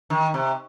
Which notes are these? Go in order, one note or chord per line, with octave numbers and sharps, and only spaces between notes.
D#3
C3